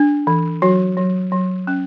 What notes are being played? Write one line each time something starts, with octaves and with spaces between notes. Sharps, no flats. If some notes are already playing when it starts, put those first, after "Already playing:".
Already playing: D4
E3
F#3 F#4
F#3
F#3
C#4